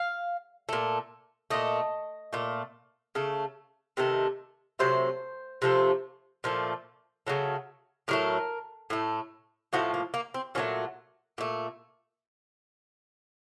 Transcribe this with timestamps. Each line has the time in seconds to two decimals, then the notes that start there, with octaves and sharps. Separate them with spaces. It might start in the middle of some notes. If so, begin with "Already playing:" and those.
Already playing: F5
0.69 A#2 A3
1.50 A#2 A3 D#5
2.33 A#2 A3
3.15 C#3 A3
3.97 C3 D#3 A3
4.79 C3 F#3 A3 C5
5.62 C3 F3 A3
6.44 A#2 F3 A3
7.27 C#3 F#3 A3
8.08 A2 F#3 A3 A#4
8.90 A2 A3
9.73 A2 F3 A3 F#4
9.94 A#3
10.14 A#3
10.34 C4
10.55 A#2 F#3 A3 C#4
11.38 A#2 A3